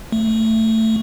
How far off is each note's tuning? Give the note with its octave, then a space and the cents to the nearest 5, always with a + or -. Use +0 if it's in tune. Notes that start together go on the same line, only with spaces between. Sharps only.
A3 +15